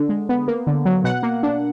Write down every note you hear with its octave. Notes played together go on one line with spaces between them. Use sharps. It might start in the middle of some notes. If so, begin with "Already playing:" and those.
Already playing: D3
G#3
B3
A#3
D3
F#3
B2 F#5
A#3
D4